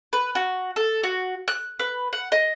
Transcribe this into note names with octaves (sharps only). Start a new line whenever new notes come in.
B4
F#4
A4
F#4
F#6
B4
F#5
D#5